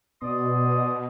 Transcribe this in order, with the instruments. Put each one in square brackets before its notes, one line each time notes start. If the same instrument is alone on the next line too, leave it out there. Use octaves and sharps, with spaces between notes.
[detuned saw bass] B2 [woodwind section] D5 C6 D#6